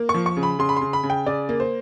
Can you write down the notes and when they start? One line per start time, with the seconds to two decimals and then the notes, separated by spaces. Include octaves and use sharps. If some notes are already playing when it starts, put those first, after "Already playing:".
Already playing: A#3
0.09 C#6
0.14 F3
0.26 C#6
0.37 C#3
0.43 B5
0.59 C#3 C6
0.69 B5
0.77 C#3 C6
0.93 B5
1.03 C#3
1.10 G5
1.26 C#3 D5
1.49 A#3
1.60 C5